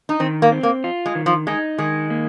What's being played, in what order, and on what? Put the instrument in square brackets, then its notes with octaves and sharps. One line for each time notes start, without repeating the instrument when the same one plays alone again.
[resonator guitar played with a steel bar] D#4
[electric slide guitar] D#3 [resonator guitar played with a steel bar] C4
[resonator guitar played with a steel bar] A#3
[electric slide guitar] C4
[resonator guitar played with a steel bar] A#3
[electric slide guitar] F4
[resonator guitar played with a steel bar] G#3
[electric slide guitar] D#3
[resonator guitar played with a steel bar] F3
[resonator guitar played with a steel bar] G#3 [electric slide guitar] D#4
[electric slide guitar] D#3 [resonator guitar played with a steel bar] G#3
[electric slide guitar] A#3